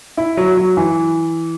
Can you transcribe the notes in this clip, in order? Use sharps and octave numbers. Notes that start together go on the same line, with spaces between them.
E4
F#3
F#3
E3